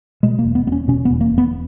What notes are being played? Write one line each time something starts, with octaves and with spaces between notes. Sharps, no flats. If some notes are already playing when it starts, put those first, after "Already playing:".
B2 G#3
A#3
E1
B3
E1 B3
C#4
B2 C#4
B3
E1
A#3
E1
B3